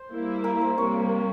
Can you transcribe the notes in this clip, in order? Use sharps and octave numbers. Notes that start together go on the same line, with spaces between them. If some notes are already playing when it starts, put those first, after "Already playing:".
Already playing: C5
G3 A#3 E4
A#4
C5
C3 G3 A#3 C#5